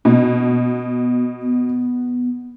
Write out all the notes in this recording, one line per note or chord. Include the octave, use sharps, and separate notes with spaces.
B2 B3
B3